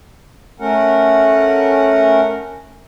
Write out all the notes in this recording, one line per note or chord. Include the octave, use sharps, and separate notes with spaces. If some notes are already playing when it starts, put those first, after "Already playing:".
A3 C#4 A#4 F#5